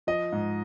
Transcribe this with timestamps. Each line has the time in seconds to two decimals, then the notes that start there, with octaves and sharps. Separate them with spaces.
0.07 F3 D#5
0.32 G#2